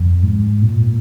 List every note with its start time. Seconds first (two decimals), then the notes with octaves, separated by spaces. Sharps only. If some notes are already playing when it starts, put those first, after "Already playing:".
Already playing: F2
0.23 G#2
0.62 A#2